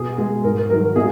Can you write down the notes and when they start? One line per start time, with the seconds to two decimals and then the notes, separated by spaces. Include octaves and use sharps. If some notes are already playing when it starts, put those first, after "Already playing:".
Already playing: B2 G#4
0.18 G#3 G#4
0.44 G#2 A#4
0.70 D#3 F#3 A#4
0.96 A#2 G#4